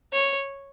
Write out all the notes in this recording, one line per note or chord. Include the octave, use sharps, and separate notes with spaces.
C#5